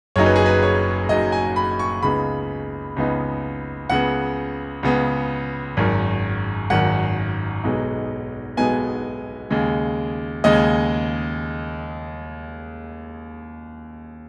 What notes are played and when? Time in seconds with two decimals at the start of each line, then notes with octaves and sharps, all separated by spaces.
0.16 F#1 F#2 F#3 D#4 C#5
0.26 B4
0.36 G#4
0.46 B4
0.63 C#5
1.09 F#1 F#2 F#3 D#4 D#5
1.32 G#5
1.56 B5
1.79 C#6
2.03 C#2 C#3 B3 D#4 B5
2.96 C#2 C#3 B3 D#4
3.89 C#2 C#3 B3 F#5
4.83 C#2 C#3 B3
5.77 G#1 F#2 D#3
6.70 G#1 F#2 D#3 F#5
7.64 B1 B2 G#3 B3 D#4
8.57 B1 B2 G#3 B3 D#4 G#5
9.50 D#2 C#3 G#3
10.44 D#2 C#3 G#3 D#5